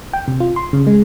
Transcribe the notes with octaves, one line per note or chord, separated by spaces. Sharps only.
G5
C3
F4
C6
C#3
G#3